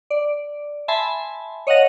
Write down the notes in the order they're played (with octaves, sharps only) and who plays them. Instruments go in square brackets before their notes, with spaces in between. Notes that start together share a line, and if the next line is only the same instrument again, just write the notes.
[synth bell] D5
E5 G#5 A5 B5 C6
C#5 D#5 F5 F#5 A#6